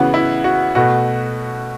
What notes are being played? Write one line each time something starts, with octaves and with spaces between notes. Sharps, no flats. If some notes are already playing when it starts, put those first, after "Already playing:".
Already playing: C#3 E3 B3 F#4
E4
F#4
B2 A3 F#4